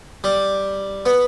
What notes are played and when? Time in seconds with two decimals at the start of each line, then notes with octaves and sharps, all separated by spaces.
0.24 G3
1.06 B3